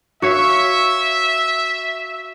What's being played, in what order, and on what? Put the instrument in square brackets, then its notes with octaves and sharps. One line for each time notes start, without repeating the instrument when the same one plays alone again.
[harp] F#4 C#5 F5 [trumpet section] E5